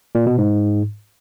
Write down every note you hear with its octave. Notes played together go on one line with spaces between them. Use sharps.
A#2
B2
G#2